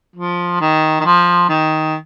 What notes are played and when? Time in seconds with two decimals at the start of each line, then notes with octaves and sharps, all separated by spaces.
0.16 F3
0.61 D#3
1.00 D#3
1.05 F3
1.49 D#3